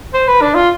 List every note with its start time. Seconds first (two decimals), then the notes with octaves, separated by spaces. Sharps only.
0.14 C5
0.27 B4
0.41 D4
0.55 F4